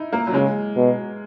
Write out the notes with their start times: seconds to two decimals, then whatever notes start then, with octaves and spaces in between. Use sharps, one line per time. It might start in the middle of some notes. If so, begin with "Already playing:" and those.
Already playing: D#4 E4
0.12 A#3
0.27 F#3
0.33 C#3 G#3
0.76 B2